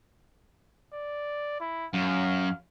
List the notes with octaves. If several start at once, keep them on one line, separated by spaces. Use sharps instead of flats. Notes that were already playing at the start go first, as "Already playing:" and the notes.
D5
E4
F#2 F5